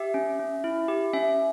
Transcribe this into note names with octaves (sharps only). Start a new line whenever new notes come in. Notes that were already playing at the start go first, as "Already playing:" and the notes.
Already playing: G4 E5
C#4
C#4
E4
G4
C#4 E5